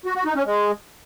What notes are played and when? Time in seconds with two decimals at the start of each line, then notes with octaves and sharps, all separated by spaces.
0.05 F#4
0.16 F#4
0.26 D#4
0.36 C#4
0.46 G#3